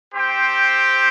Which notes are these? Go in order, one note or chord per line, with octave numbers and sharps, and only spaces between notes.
C4 G4 C5 G5